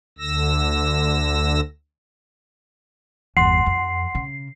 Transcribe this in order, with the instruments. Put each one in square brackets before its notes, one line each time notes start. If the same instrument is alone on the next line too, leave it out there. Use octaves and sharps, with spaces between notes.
[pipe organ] D2 D3 E6 A#6
[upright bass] G1 E2 [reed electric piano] F#5 C6 [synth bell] C7
[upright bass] F2
C#3